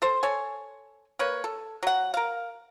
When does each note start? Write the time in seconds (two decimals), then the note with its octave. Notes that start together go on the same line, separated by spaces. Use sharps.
0.02 A4 C5
0.23 A4 C#5 G#5
1.19 A#3 B4 C#5
1.44 A4
1.83 F#3 F#5
2.14 A#4 F5